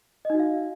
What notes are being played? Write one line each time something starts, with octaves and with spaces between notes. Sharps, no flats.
D#4 F#4 D#5 F5